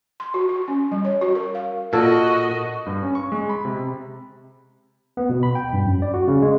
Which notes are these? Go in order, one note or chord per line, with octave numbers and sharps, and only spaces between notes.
C6
F#4
F#4
C#4
G3
C#5
F#4
A#4
F5
A#2 F#4 A4 D#5
G2
C#4
C#6
G#3
B5
C3
B3
B2
B5
G5
G2
F#2
D5
F#4
C#3
G#3